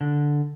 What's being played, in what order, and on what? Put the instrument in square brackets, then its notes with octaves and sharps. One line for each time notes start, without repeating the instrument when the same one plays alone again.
[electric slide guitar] D3